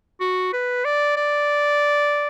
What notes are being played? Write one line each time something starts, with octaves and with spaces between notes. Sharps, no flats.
F#4
B4
D5
D5